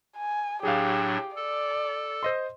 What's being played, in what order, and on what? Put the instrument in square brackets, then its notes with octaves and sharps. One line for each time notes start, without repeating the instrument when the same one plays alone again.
[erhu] G#5
[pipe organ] A2 F#3 D4 [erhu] G4 [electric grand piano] G#4 F5
[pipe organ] A4 [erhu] D5
[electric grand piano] C5 D#5 C6